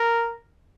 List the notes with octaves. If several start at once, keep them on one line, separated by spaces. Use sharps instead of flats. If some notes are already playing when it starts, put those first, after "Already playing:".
Already playing: A#4